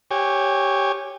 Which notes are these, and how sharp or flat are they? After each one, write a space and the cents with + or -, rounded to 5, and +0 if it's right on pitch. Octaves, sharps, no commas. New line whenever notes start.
G4 +0 C#5 +0 G#5 -20